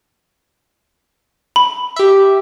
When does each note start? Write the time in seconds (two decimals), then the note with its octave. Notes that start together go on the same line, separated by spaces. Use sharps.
1.56 B5
1.96 G4 E5